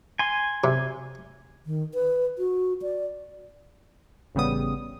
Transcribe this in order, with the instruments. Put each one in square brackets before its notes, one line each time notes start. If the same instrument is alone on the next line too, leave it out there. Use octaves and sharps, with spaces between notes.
[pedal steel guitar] G#5 C6
[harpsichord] C3
[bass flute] D#3
B4
F#4
D5
[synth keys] A1 C#3 G3 B3 D#6